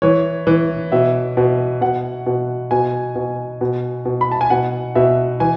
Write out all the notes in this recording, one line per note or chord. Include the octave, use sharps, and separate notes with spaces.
E3 C#5
E3
B2 E5
B2
B2 F#5
B2
B2 G#5
B2
B2
B2
B5
A5
G#5
B2 F#5
B2 E5
E3 G#5